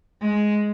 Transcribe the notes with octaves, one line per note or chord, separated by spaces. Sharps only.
G#3